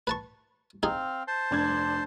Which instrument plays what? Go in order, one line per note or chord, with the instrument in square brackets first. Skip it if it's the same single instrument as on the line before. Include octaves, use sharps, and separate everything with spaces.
[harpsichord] B4 A5 C#6
[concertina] C4 F5 [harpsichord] D#4 G#4
[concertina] C5 A5 C6
[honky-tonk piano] F1 D4 G#6